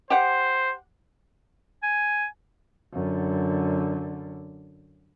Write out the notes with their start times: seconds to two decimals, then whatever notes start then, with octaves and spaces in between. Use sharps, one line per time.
0.10 G4 C5 F#5
1.83 G#5
2.93 F#2 D3